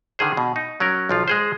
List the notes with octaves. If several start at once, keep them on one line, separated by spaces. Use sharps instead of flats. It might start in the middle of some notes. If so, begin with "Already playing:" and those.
D3 D#3 G#4 C5
B2
D#4
F#3 C#4 A#4
B1 F3 F4
G#3 G#4 C5